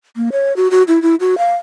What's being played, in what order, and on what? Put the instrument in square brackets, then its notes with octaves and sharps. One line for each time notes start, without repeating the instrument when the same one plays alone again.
[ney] A#3
C#5
F#4
F#4
E4
E4
F#4
F5